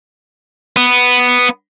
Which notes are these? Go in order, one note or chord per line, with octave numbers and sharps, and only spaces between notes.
B3